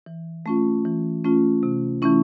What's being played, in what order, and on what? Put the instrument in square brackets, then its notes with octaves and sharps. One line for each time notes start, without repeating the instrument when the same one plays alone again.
[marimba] E3
A3 C#4 F4
E3
A3 C#4 F4
C3
E3 A3 C#4 E4